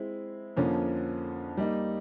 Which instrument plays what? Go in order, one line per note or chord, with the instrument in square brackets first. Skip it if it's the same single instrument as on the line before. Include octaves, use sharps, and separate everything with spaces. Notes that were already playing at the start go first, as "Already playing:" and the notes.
Already playing: [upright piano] G#3 C4 E4
F2 D3 F3 A#3 C#4
G3 A#3 D#4